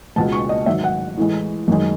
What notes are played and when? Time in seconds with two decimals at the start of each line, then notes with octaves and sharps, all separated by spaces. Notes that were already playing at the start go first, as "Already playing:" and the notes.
0.16 C#2 B2 G#3 A5
0.32 C#6
0.49 D#5
0.66 G#2 D#3 F#3 E5
0.84 F#5
1.17 A2 E3 G#3
1.68 F#2 D#3 G#3